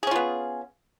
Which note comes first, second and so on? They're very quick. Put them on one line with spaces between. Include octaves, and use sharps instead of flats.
G#4 C#4 F4 B3